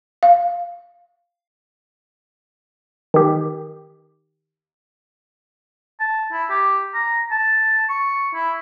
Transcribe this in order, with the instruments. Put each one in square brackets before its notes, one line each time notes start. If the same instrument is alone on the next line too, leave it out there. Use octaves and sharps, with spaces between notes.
[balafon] F5
[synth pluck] D#3 G4
[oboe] A5
E4
G4
A#5
A5
C#6
E4